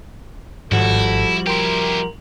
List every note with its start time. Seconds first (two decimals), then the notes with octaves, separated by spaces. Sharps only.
0.72 G#1 F3 G3 E4 F#4 A4
1.47 E4 G4 A#4 G5 C6